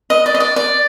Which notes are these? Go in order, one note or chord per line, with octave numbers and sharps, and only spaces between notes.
D#5
D5
D#5
D5
D5